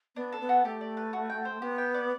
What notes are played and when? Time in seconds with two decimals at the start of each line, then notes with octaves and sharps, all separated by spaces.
0.16 B3 D4
0.32 A4
0.41 B3
0.49 F#4
0.65 A3 G4
0.81 D5
0.97 B4
1.13 F#4
1.30 G5
1.45 C5
1.61 B3 G4
1.78 G5
1.94 D5